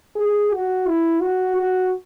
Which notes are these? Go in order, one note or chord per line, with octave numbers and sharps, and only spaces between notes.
G#4
F#4
E4
F#4
F#4